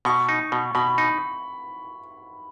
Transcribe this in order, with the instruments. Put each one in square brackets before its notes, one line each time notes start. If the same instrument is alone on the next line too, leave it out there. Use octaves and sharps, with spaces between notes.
[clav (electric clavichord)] B2 [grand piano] C#6
[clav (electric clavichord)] D#4
B2
[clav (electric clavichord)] B2 [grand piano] B5
[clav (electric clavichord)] D#4